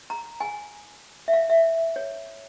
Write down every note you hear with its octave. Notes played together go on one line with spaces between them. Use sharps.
A#5
G#5
E5
F5
E5
C#5